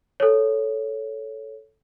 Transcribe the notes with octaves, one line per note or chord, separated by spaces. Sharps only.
A4 C#5